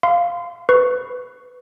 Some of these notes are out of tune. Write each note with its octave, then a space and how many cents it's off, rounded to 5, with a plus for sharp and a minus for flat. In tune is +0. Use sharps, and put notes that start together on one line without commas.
F5 +0 C6 -30
B4 +15 C#6 +0